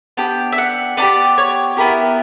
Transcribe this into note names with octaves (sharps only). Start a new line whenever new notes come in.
B3 D4 G4 G5
E5
F#5
B3 D4 G4 D5
C#5
B3 E4 G4 A#4